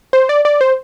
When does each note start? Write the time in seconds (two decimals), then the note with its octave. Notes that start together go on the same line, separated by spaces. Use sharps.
0.13 C5
0.29 D5
0.45 D5
0.61 C5